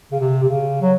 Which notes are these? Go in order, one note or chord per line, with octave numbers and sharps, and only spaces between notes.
C#3
C3
C3
C#3
F#3